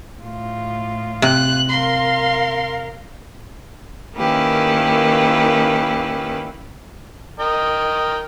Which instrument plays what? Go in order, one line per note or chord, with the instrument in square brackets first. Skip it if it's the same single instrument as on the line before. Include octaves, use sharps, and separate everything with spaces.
[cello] A2 F4
[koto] C3 [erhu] F#6
[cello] A#4 F5 [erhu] C6
[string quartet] D#3 A#3 C#4 E4 G4 B4
[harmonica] A#4 D#5 G5